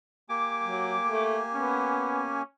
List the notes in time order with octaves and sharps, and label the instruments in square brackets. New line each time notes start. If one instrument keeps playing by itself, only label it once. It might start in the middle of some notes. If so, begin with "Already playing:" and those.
[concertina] A#3 G4 G#5 [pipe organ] D6
[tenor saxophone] F#3
A3
[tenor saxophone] B3 [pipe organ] C#4